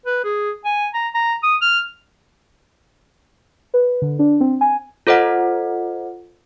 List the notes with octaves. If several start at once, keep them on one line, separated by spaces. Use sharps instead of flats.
B4
G#4
G#5
A#5
A#5
D#6
F6
B4
D3
D4
C4
G#5
F4 A4 C5 D#5 F#5